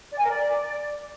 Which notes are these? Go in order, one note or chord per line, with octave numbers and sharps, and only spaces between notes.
D5
G#5
A#4
D5